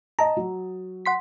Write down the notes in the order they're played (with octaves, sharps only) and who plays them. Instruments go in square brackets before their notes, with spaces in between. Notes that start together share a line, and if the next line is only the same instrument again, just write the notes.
[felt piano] D#5 A5 [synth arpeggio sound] A#5
[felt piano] F#3
[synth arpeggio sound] F#5 C6 B6